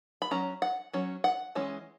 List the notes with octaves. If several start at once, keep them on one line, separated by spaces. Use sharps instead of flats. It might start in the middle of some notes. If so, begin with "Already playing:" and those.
B5
F#3 C#4 A#5
F#5
F#3 C#4
F#5
E3 G#3 C#4